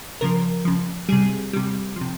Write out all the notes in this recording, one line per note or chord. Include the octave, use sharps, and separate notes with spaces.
C#3 F3 A#4
C#3 F3
C3 G3 G#4
C3 G3
F3
C3